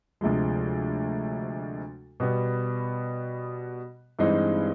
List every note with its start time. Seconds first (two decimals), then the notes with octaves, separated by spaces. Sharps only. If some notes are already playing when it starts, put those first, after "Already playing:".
0.21 D2 C3 F3 G#3
2.20 B2 G3 B3
4.19 G2 E3 G#3 C4 D#4